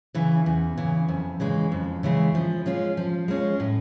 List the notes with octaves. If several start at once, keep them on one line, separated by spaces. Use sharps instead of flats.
C#3 E3
E2
C#3 E3
F2
C#3 E3 G#3
F2
C#3 E3 G#3
F3
G#3 C#4 F4
F3
G#3 C#4 F4
A2